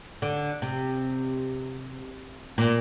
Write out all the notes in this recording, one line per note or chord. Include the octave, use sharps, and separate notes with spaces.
D3
C3
A#2